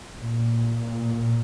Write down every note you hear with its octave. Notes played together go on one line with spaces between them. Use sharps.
A#2